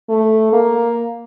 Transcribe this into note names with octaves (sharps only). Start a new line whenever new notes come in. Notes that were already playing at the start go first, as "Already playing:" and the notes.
A3
A#3